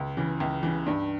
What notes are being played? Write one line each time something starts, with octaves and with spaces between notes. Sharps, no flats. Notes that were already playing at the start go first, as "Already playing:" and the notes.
Already playing: C#2
C#3 E3
C#2
C#3 E3
G2